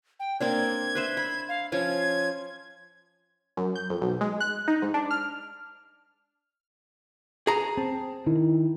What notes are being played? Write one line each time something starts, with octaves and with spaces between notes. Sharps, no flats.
G5
A#3 C4 D4 G#6
B4 C5 E5
B5
F5
F3 C#4 F4 G#6
F#2
G6
F2
B1
G#3
F#6
D#4
G#2
D4
F6
G#4 A#5
C4 A5
D#3 E4